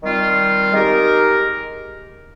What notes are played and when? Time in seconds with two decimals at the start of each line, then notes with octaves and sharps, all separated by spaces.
0.02 D#3 G3 C4 F4
0.72 G#3 D#4 G4 A#4